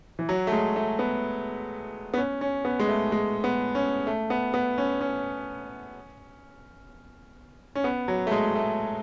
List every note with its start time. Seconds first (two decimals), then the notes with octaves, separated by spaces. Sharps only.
0.19 E3
0.29 F#3
0.47 A3
0.52 G#3
0.76 A3
0.99 B3
2.14 B3
2.17 C#4
2.41 C#4
2.65 B3
2.80 G#3
2.89 A3
3.12 G#3
3.44 B3
3.75 C#4
4.07 A3
4.30 B3
4.54 B3
4.78 C#4
5.01 C#4
7.75 C#4
7.84 B3
8.08 F#3
8.27 A3
8.31 G#3
8.55 A3